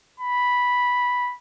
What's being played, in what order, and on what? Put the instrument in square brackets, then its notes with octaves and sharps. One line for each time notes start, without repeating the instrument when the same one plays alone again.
[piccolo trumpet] B5